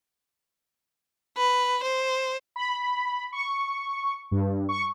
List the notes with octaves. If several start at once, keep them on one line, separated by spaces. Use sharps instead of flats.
B4
C5
B5
C#6
G2
C#6